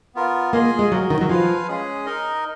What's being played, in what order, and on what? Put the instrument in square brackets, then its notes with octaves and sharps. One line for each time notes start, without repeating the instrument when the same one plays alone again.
[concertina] B3 F4 A#4
[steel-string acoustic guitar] A#3 [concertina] F4 G#4 D#5 G#5
[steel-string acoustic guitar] A#3
G#3
[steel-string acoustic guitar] F#3 [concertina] F#4 A#4 D#5
[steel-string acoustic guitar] D#3
F#3
[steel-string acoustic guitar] F3 [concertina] F4 B4 F5 G#5
[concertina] G#3 C#4 G#4
D#4 A#4 D#5